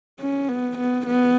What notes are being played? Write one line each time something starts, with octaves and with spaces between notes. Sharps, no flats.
C#4
B3
B3
B3